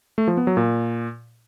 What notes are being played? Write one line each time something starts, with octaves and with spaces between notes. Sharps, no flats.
A3
F3
B3
F#3
A#2